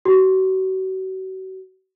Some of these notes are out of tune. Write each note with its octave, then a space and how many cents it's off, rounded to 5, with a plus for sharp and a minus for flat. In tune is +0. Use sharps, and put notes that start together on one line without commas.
F#4 +35